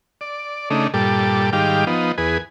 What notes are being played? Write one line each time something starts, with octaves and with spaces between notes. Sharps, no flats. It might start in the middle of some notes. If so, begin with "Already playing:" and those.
D5
C#3 A3 D4 D#4
G2 A#2 G3 A4 D6
G#2 D#3 G3 G4 F5 D6
F3 B3 D#4
E2 G#4 B4